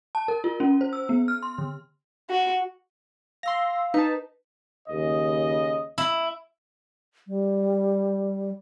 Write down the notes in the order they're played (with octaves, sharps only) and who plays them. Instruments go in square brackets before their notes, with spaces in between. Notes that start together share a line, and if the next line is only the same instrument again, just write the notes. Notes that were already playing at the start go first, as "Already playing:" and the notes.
[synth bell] A5
A#4
F4
C#4
C5
E6
B3
F6
C6
D3
[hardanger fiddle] F#4
[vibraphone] F5 E6 [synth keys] C6 A#6
[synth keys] D#4 A5 [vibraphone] B4
[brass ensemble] D#2 C#3 D#5
[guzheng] E4
[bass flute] G3